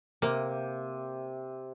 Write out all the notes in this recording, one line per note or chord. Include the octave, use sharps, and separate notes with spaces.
C3 A#3